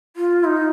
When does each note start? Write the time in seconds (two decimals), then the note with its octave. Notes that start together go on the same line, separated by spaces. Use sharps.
0.16 F4
0.44 D#4